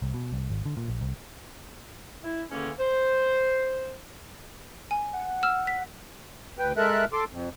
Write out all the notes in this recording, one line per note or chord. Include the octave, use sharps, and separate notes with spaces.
C2
B2
C2
G#1
D3
A#2
A#1
C2
E4
E2 D3 D#3 A#3 C#4
C5
G#5
F#5
E6 F6 E7
B6
D2 B4 G5
G#3 A4 A#4 E5 F#6
A4 C6 D6
F2